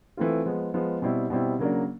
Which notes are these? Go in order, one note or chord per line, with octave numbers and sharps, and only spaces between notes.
E3 A3 C4 F4
F3 G#3 B3
F3 G#3 B3
B2 G3 C4 E4
B2 G3 C4 E4
C#3 F#3 A#3 D4